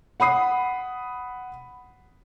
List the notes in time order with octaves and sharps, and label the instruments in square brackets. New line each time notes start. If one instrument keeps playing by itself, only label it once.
[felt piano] F#5 B5 D#6 C7